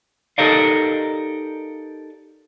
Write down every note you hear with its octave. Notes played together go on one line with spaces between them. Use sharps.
D#4 G4 A4 A#4 D5 F5